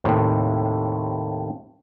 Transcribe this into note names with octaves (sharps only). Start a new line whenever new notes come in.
D#2 A2 C3